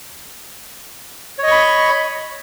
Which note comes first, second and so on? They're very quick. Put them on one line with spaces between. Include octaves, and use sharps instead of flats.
C#5 D#5 C#6 B5